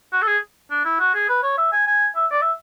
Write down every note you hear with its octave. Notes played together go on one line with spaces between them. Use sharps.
F#4
A4
G#4
D4
E4
F#4
G#4
B4
C#5
E5
G#5
G#5
E5
D5
E5